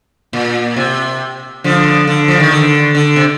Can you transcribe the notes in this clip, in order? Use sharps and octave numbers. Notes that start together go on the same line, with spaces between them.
A#2
C3
D3 F3
D3
F3
D#3
D3
D3
C3